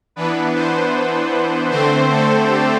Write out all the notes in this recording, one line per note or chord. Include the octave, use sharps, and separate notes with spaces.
E3 B3 D4 B4
C5
D3 A3 C4 C5
A4
G4